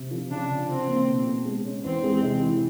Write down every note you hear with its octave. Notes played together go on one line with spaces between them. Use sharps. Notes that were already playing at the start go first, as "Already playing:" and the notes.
Already playing: C3
F3
C#3 D4
C#3
F3 C4
A#3
B2
B2
G#3
C#4
E2 C4
G#3
C3
E3